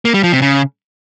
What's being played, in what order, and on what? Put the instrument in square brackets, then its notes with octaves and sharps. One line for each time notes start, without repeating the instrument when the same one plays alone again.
[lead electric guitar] A#3
G3
F3
C3
C#3